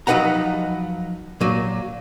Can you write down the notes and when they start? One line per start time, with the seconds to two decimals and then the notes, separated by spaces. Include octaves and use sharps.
0.07 F3 F#3 D#4 B4 F#5 A#5
1.41 A#2 F#3